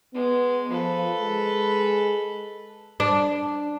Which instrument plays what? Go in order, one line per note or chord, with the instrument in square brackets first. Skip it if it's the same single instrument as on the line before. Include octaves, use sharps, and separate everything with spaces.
[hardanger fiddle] G#3 [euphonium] B3
[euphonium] F3 [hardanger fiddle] A4 B4
[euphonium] G#3
[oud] D4